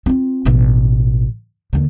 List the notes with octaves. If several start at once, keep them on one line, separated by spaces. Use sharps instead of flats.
C4 F4
A1 B2
D#2 D3